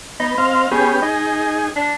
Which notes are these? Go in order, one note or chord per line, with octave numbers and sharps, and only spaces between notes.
B3 D#5
C4 F5
B3 C#4 G4 G#4
D#4 G#4 D#5
D4